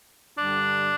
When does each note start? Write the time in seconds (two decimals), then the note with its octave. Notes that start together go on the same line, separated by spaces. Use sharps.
0.36 G2 D3 G3 D4